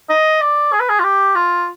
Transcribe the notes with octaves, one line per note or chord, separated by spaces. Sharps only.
D#5
D5
G#4
B4
G#4
F4
G4
F4